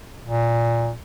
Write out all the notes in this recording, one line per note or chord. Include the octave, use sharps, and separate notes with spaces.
A#2